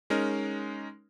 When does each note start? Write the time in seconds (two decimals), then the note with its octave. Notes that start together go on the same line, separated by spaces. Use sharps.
0.10 G#3 C#4 D#4 A#4